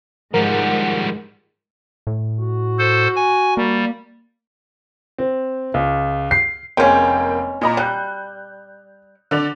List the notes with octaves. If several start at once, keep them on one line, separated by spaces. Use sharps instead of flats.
G#2 F3 G3 A#4 F#5
A2
F#4
A4 C5
G#5
G3 A#3
C4
C#2
C7
F1 G#3 A#3 C#4 G5
A#2 D#5 A#5
G3 F#6 G6
D3 D5 F7